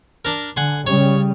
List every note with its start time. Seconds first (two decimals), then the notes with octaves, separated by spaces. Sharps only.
0.25 D4 A#4
0.57 D3 F#5 G#5 C6
0.87 C#3 G3 C#4 C#5